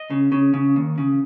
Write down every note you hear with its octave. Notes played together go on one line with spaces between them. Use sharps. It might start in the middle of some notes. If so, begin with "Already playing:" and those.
Already playing: D#5
C#3
C#3
C#3
D#2
C#3